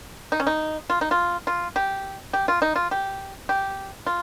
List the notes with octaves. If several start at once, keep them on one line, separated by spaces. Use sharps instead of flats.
D#4
C#4
D#4
F4
D#4
F4
F4
G4
G4
F4
D#4
F4
G4
G4
F4